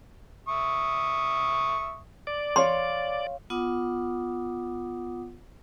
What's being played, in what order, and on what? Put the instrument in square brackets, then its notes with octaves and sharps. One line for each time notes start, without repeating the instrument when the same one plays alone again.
[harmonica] E5 C#6 D#6
[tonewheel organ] D5
[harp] C#5 F5 [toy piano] C6
[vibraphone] B3 F4 F#5 D6 D#6